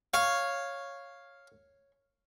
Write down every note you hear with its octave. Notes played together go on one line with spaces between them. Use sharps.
C#5 F5